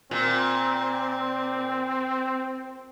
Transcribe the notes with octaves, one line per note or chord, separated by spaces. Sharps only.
A#2 C4